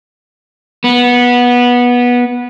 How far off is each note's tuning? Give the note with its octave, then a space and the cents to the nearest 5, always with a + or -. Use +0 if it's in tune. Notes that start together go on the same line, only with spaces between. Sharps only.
B3 -15